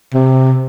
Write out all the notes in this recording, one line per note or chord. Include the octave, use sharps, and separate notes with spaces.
C3